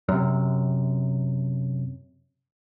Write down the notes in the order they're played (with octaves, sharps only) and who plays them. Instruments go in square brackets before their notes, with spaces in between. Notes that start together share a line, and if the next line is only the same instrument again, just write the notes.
[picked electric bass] F#2 C3